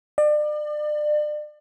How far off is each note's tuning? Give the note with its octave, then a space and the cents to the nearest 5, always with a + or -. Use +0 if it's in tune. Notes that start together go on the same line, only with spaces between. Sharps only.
D5 +35